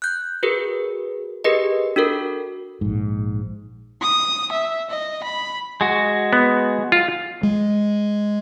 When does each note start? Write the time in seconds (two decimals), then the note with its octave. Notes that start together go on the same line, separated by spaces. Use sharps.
0.02 F#6 G6
0.43 F#4 G#4 A#4 B4
1.44 G4 G#4 A#4 B4 D#5
1.96 D4 F#4 A4 A#4
2.81 A#1 G#2
4.02 D#6
4.52 E5
4.90 D#5
5.23 B5
5.81 G#3 F#4
6.33 B3
6.92 F4
7.43 G#3